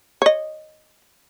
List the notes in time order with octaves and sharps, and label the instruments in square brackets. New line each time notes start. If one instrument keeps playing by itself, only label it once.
[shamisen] C#5 D#5